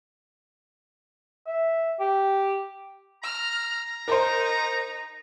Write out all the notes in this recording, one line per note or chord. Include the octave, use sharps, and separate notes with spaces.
E5
G4
A#5 F6
D#4 A#4 C5